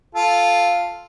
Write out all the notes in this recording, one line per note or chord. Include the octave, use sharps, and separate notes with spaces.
F4 A4